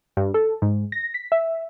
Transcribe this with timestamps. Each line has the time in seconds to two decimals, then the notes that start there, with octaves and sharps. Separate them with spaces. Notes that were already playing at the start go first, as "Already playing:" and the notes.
0.17 G2
0.34 A4
0.62 G#2
0.92 A#6
1.14 B6
1.32 E5